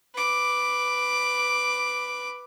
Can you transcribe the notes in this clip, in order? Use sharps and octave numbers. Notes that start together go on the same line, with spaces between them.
B4 D6